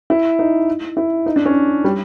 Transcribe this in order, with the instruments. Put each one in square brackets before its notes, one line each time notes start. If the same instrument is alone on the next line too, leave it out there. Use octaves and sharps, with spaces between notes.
[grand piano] E4
D#4
E4
D#4
D4
C#4
G3